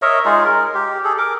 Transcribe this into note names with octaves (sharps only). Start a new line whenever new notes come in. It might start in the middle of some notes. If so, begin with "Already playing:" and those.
A#4 C#5 D#5 E5
G#3 D#4 F4 G#4
A#4
G4
G#4 A4
A#4 D6